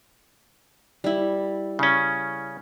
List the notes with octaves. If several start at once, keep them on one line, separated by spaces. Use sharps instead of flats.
G3 E4
C#3 C#4